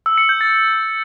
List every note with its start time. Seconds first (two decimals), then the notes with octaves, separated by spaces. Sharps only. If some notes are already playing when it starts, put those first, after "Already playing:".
0.06 E6
0.18 C#7
0.29 G6
0.41 A6